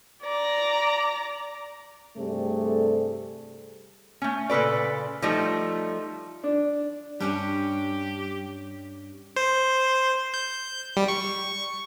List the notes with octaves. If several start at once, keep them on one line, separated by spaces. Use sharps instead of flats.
D5 A#5
G2 C3 G3 A3 G#4 A4
A3 C#4
A#2 C#3 A4 B4 D5
F3 G3 A3 D#4
D4
G2 G3 C#4 D4 G4
C5
G6
G3
C#6